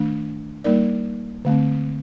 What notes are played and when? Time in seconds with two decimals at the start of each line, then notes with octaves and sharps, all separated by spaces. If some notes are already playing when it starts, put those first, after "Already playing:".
Already playing: D#3 A3 D4
0.64 G3 A#3 D#4 A#4 D5
1.45 D3 A3 C4